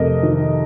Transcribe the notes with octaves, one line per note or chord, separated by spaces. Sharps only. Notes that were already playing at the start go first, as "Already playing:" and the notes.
Already playing: F2 C3 A3 A#4 D#5
D#3